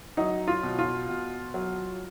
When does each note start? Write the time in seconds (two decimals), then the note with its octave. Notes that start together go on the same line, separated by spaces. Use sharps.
0.17 F#3 D#4
0.48 F4
0.63 B2
0.79 F4
1.09 B2
1.54 F#3